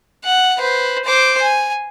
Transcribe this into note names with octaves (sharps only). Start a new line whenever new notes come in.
F#5
B4 C5
C5 D6
G#5